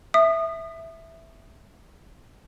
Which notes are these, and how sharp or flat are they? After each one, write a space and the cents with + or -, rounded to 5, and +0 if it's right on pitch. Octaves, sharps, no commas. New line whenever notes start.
E5 +0 D#6 -25